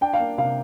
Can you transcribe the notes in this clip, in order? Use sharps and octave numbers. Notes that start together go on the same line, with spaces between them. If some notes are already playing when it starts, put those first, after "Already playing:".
D4 G5
F5
A#3
C3 F5